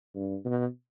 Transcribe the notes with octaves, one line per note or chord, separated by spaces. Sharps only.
G2
B2